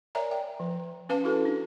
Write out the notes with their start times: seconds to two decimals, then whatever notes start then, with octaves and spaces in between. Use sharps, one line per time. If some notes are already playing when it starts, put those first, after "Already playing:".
0.15 A#4 C#5 D5 E5 G#5 A#5
0.31 G5
0.60 F3
1.09 C#4 B4 F5 A5
1.24 E4 F#4 A4
1.45 D4